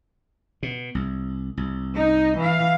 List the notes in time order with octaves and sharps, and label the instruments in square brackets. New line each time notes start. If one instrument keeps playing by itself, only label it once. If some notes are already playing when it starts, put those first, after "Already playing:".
[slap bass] B2
C2
C2
[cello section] D#4 D#5
E3 F5